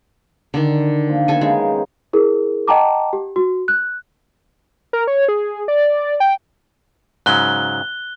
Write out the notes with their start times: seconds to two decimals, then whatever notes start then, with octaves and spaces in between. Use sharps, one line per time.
0.54 D3 D#3
1.07 A#2 F3 G4
1.28 B3 A4 D#5 E5 G#5
1.41 C#3 F3 G#3 D#4
2.13 E4 G#4 A#4
2.68 D#5 F#5 G5 A5 A#5 D6
3.13 G4
3.36 F#4
3.68 F#6
4.93 A#4
5.07 C#5
5.28 G#4
5.68 D5
6.20 G5
7.26 G#2 C#3 F#3 F#6 G7